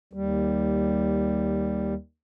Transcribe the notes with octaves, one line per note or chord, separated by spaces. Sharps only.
D#2 G3